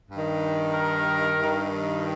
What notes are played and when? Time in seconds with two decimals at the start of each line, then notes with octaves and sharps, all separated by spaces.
0.10 G2 D#3
0.74 A#4
1.38 G2 D#3